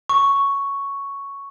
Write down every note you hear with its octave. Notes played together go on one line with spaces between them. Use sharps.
C#6